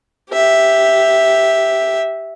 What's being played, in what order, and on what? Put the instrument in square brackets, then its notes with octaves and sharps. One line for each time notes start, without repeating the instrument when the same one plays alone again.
[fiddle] G4 E5